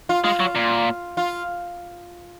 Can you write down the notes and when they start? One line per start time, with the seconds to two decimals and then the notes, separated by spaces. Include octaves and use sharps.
0.09 F4
0.24 G#3 F4
0.40 F#3
0.55 A#2
1.17 F4